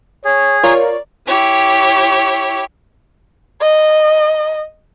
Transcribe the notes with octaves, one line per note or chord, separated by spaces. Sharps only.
G#4 C#5
F4 A#4 C#5 D5
E4 G4 C#5
D#5